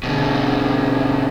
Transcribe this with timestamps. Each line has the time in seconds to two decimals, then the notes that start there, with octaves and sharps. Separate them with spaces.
0.04 B2 D3